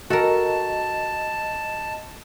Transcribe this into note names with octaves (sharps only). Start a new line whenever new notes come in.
F#4 A4 A#4 D#5 A5